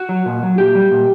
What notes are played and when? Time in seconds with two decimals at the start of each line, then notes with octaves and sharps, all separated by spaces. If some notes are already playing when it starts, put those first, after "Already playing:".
Already playing: F#4
0.09 F#3
0.26 A#2
0.43 F#3
0.58 A#2 G4
0.75 G3
0.91 A#2